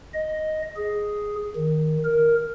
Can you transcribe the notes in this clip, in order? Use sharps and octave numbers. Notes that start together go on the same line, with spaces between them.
D#5
G#4
D#3
A#4